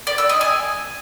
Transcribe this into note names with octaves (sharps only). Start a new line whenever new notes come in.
D5
E6
D#5
G#5